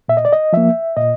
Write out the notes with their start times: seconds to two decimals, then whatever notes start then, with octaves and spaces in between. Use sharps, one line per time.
0.08 A#2 E5
0.17 D#5
0.25 D5
0.33 D#5
0.53 F3 A#3 E5
0.97 A#2 D#5